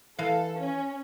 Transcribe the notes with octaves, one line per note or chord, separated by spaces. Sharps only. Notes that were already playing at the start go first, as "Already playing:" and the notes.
E3 A4 F5
C#4